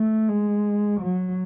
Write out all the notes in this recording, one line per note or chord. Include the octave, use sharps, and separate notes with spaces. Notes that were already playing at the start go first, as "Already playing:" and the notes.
Already playing: A3
G#3
F#3